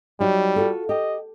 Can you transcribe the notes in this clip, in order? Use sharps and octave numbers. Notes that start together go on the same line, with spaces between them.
F#3 G3 D#4 F#4
F4 F#4 A4
G4 D#5